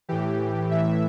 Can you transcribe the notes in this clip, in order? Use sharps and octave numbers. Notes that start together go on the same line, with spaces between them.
A2 E3 G4
A2 E3 E5